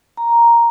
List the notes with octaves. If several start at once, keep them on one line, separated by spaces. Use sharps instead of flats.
A#5